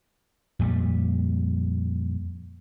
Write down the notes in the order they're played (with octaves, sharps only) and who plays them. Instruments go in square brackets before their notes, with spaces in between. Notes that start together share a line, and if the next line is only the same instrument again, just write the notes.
[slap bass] F2 A#2 G3